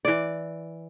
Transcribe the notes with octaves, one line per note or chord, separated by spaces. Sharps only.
E3 D5